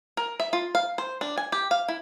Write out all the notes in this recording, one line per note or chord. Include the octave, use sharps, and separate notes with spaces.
A#4
E5
F4
F5
C5
D4
G#5
G4
F5
E4